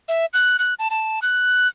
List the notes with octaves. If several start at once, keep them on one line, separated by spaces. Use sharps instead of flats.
E5
F#6
F#6
A5
A5
F#6